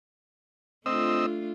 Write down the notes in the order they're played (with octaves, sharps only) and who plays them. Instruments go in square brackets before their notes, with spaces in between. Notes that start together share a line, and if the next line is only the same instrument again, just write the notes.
[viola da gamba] A3 D4 F4 [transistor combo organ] C4 D#5 E6